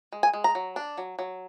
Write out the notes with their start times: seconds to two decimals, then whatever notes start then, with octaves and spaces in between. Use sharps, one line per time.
0.12 G#3
0.23 G#5
0.34 G#3
0.44 A#5
0.55 F#3
0.76 D4
0.98 F#3
1.19 F#3